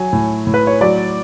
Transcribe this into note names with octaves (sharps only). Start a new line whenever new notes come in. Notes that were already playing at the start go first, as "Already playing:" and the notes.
Already playing: F#3 G#5
A2
A2
B4
C#5
F#3 D5